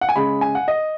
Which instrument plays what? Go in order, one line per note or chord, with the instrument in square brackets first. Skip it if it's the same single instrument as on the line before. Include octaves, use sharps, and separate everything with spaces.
[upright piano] F#5
G#5
C#3 G#3 B5
G#5
F#5
D#5